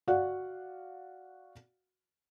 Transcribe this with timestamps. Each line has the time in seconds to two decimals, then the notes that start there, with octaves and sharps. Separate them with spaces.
0.08 F#4 D5 F5 F#5